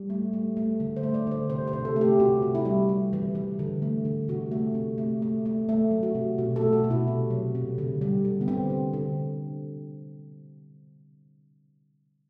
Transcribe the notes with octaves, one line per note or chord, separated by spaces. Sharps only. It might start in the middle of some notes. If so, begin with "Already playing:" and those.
Already playing: G3
A3
A3
A3
D3
C5
A3
D5
D3 C5
C3 C5
C5
C3
A4
A3
G4
C3 F#4
C3
E4
G3
G3
E3
E3
D3
A3
D3
C3 F#4
A3
C3
A3
A3
A3
A3
F#3
F#4
C3
B2 F#4
A3 A4
F#4
B2
E4
C3
F#3
C3
D3
G3
D3
B3
D3 C4
D3
D3